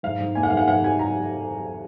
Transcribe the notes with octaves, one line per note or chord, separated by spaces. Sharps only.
G#2 F5
G#2
A#3 G#5
F#5
G#2 F5
F#5
G#2 F#5
F#3 G#5
A#5